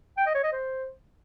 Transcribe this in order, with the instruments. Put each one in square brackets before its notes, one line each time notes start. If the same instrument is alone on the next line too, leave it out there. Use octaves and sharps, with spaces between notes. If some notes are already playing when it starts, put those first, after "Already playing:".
[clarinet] G5
D#5
C#5
D#5
C5